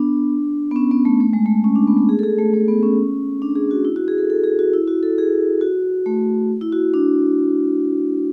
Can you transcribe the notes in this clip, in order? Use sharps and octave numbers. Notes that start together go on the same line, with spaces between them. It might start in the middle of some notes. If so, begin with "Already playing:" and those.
Already playing: B3 D4
B3
C#4
B3
A3
A3
G#3
A3
C#4
D4
B3
A3
G#4
A4
G#4
A3
A3
B3
C#4
D4
G#4
F#4
E4
F#4
G#4
A4
A4
G#4
F#4
E4
F#4
A4
G#4
F#4
A3
E4
F#4
D4